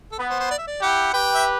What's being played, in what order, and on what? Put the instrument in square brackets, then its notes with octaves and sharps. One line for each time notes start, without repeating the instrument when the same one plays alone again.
[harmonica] A4
[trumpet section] B3 [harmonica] B4
[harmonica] C5
C5
D5
E5
D5
[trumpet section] E4 G4 [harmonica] F#5
[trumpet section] G4 B4 [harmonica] G5
[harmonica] E5